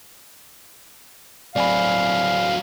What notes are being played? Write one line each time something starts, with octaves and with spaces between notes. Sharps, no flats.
F#3 C4 D5 F5 G#5 B5